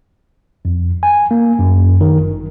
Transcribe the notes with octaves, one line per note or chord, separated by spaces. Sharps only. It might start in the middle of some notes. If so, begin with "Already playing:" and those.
F2
G#5
A#3
F#2
D#3
G1